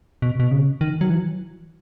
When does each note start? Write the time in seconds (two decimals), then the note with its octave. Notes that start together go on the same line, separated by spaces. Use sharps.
0.22 B2
0.40 B2
0.51 C#3
0.81 D#3
1.01 F#3
1.10 E3